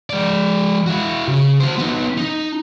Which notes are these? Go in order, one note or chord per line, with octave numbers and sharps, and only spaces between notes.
G#3 D5
E4 F#4
C#3
F#4 C5
B3 D#4
D#4